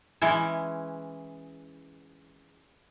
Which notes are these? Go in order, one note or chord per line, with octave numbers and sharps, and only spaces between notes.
E3 G#3 C#4 E4